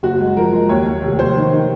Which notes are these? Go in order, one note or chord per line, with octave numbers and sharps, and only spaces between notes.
F#1 F#4
G#3
F3 A#4
G#3
D#2 C#5
D#2
F1
F1 C5
D#3
D#3